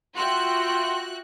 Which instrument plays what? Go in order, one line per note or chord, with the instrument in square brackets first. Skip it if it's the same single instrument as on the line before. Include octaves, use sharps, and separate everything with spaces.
[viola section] F4 E5 G5 [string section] F#4 F#6 [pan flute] C6